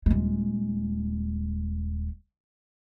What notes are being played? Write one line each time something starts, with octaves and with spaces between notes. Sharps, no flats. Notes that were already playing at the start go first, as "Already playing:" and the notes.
D#1 G#3